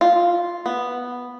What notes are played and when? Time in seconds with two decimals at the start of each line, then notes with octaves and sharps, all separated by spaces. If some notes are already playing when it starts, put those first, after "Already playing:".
0.01 F4
0.66 B3